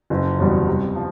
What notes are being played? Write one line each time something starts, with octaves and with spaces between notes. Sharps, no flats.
F#1
E2 B2 G3
C3
F3